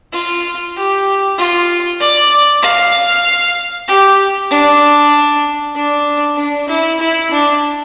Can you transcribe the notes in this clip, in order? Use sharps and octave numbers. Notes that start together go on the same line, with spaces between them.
F4
G4
F4
D5
F5
G4
D4
D4
D4
E4
E4
D4